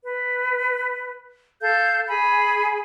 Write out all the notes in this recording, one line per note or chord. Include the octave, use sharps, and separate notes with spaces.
B4
A4 F5 G6
G#4 G#5 B5